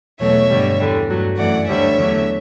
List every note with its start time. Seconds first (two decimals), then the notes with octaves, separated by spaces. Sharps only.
0.20 E2 B2 F#3 A3 C#5 E5
0.50 G2 D3 G3
0.79 E2 D3 G3
1.09 G2 F#3 A3
1.38 F#2 E3 A3 D5 F#5
1.68 D2 D3 G3 C#5 E5
1.98 E2 D3 F#3 A3